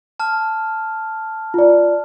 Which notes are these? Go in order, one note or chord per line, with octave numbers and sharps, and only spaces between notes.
A5 F6
F4 D5